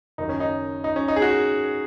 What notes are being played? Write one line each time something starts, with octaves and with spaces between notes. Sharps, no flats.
F#1 F#2 D#3 F#3 D#4
C#4
D#4
D#4
C#4
D#4
G#4
F#4